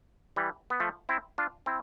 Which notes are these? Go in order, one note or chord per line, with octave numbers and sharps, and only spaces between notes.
E3 G3
B3
F3 A3
C4 E4
D4 F4
C4 E4